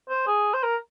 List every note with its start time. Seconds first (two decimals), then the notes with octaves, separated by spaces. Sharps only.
0.09 C5
0.27 G#4
0.54 C5
0.63 A#4